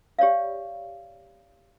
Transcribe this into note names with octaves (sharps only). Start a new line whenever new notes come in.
G4 C#5 D5 F5